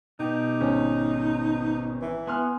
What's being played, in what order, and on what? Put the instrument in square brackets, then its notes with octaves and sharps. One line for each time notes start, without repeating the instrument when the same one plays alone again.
[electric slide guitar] B2 G4 [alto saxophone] D#4
[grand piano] G#1 C4 C#4
[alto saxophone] E3
[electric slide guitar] B3 [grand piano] G#5 C6 F6